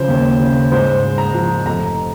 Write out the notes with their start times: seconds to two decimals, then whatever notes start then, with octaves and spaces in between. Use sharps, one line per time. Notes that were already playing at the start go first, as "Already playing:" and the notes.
Already playing: C#3 F3 C5
0.08 D#2
0.39 C#3
0.71 G#2 C5
1.03 G#3
1.18 A#5
1.34 F3
1.66 F1 A#5